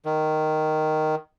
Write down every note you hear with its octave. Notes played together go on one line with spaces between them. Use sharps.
D#3